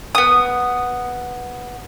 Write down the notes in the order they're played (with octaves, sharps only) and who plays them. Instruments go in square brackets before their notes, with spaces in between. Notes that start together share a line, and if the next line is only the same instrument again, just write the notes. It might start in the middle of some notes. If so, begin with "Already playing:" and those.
[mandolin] B3 D#6